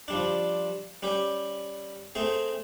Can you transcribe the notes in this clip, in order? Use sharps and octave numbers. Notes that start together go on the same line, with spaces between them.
F3 G3 D4
G3 C#4 G4
A3 C4 G#4